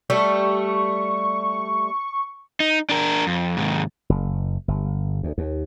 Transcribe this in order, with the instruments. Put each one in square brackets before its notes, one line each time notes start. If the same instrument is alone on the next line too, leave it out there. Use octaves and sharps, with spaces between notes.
[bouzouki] G3 A3 A4 [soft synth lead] C#6
[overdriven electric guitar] D#4
D4 A#4
F2
D#2 G#2
[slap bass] F#1
G1
D2
D#2